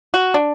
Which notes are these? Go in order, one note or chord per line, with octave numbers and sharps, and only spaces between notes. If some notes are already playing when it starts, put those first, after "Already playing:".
F#4
D4